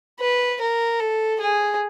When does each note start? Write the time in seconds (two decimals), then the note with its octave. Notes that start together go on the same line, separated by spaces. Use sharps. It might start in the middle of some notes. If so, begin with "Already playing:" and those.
0.20 B4
0.61 A#4
1.00 A4
1.40 G#4